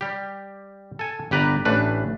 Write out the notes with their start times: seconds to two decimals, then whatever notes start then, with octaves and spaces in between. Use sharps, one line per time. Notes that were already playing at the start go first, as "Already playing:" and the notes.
0.01 G3 G4
0.99 A4 G#5
1.31 G1 G4 B4 D5 A#5
1.65 A1 E3 A3 D4 B4